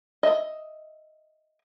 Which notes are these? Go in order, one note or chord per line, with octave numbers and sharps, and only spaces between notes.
D#5 E5